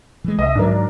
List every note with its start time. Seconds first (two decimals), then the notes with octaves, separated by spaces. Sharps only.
0.24 E3 G#3
0.39 C2 D#5 E5
0.55 G#2 D#3 F#3 D4 A#4